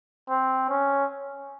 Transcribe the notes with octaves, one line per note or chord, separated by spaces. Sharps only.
C4
C#4